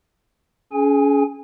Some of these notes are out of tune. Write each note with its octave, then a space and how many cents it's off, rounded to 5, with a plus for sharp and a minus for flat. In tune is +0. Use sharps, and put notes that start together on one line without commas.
C#4 +30 G#4 +30 G#5 -20